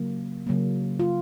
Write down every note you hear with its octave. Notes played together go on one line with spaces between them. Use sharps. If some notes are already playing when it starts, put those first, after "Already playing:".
Already playing: C#3 F#3 A#3
C#3 F#3 A#3
F4